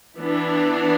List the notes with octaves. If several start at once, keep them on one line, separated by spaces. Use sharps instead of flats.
E3 B3 D4